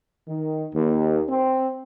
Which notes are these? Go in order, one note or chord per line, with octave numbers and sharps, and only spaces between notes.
D#3
D#2
C4